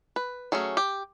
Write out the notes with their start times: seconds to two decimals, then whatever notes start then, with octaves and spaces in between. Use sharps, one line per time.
0.16 B4
0.52 F#3 A3 C#4 G#4
0.77 G4